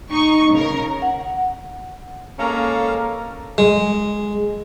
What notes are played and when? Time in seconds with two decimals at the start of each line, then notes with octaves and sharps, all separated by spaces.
0.10 D#4 C#6
0.53 C#3 A#4
1.02 F#5
2.39 G#3 A#3 C#4 A4 F5 A#5
3.58 G#3